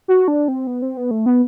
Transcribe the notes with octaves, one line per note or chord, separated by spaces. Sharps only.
F#4
D4
C4
B3
C4
B3
A3
B3